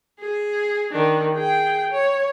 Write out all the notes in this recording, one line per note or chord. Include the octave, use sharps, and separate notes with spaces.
G#4
D#3 D4
G#4 G5
C#5